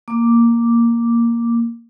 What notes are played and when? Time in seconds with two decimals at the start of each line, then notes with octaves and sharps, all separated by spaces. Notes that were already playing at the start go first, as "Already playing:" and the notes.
0.08 A#3 D6